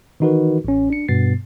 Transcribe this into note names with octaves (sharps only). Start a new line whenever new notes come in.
D#3 E3 D#4 F#4 A#4 B4
A1 C#4
D4 C#7
G2 B2 B3 A6 C7